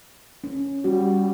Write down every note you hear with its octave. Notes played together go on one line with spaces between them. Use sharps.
C#4
G3 F#4